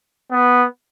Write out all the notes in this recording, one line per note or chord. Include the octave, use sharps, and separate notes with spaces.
B3